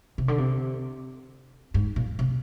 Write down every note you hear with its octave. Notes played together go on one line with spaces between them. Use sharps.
C3
D3
C3
G#2
A#2
C3